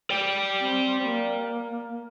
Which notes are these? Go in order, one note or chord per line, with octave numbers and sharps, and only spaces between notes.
D5 G5
C4
A#3